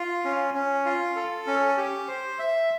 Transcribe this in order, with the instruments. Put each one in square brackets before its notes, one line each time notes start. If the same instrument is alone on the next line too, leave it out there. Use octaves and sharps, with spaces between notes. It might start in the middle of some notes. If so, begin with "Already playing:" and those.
Already playing: [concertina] F4
C#4
C#4
F4
A4
C#4
G4
C5
E5